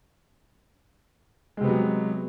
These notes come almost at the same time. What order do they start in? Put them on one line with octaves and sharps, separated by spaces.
G#3 C3 B3 F#3